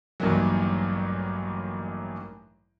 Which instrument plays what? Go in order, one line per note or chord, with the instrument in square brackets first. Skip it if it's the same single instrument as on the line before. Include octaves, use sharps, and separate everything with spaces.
[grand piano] A1 G2 A#2 D#3 E3 F#3